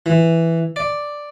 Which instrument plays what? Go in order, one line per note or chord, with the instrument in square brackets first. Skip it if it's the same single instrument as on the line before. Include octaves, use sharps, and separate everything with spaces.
[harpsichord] E3
D5